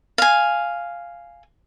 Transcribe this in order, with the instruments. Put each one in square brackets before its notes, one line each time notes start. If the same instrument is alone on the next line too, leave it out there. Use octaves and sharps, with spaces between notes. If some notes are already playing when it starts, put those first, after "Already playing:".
[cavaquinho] F5 G#5